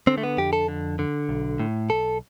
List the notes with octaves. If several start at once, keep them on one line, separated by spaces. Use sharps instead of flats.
D3 C4
A3
B3
F2 G4
A4
D3
D3
B1
A2
B1 A4